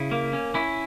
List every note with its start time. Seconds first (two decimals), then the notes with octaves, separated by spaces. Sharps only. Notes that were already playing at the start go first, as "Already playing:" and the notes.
Already playing: C#3 E4
0.11 A#3
0.33 C#4
0.54 C#4 E4